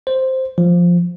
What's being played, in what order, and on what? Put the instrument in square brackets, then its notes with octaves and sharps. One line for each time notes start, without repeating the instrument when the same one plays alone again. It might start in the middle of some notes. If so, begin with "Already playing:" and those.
[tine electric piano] C5
F3